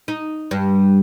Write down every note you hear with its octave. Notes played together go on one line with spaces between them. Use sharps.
D#4
G2